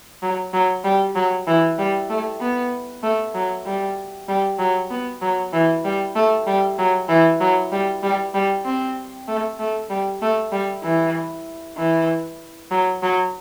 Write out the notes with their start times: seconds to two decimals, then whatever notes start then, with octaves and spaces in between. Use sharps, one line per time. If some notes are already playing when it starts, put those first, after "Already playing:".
0.22 F#3
0.53 F#3
0.84 G3
1.16 F#3
1.47 E3
1.78 G3
2.10 A3
2.41 B3
3.03 A3
3.35 F#3
3.66 G3
4.28 G3
4.59 F#3
4.90 B3
5.22 F#3
5.53 E3
5.85 G3
6.15 A3
6.46 G3
6.78 F#3
7.09 E3
7.40 F#3
7.72 G3
8.03 G3
8.34 G3
8.65 C4
9.28 A3
9.59 A3
9.90 G3
10.22 A3
10.52 G3
10.83 E3
11.77 E3
12.71 F#3
13.03 F#3